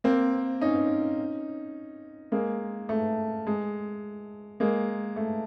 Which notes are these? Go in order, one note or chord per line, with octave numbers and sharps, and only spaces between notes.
A#3 C4
C#4 D#4
G#3 A#3
A3
G#3
G#3 A#3
A3